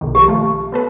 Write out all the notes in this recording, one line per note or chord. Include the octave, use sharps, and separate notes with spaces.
B1 D#3
F3 A#3 G4
A3 F4
B3 A4 B4